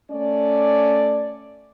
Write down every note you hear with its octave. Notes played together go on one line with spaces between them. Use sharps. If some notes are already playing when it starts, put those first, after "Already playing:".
A3 C#4 D5